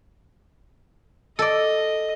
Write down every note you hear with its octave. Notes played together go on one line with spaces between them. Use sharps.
A4 D5 D#5